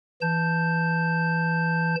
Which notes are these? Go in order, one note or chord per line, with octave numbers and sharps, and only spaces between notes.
E3 A5 G6